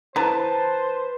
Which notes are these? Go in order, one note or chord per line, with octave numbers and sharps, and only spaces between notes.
E3 B4 C5 A5 A#5